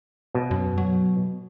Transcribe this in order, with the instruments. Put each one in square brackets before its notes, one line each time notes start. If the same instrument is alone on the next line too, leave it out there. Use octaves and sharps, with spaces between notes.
[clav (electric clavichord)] B2
[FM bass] F#2
F#3